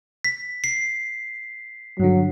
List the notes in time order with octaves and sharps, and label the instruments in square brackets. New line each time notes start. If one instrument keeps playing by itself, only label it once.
[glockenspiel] B6
C7
[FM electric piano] G2 D3 [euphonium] F#3